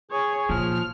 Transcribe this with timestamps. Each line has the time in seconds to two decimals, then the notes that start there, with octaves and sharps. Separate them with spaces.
0.11 G#4 C#5
0.49 A#2 F3 F6